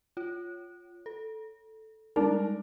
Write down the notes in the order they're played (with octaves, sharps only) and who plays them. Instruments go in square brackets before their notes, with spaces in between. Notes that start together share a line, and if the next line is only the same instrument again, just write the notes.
[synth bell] F4 C#5
A4
[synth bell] G3 G#3 [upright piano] D4 A#4 [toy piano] D#4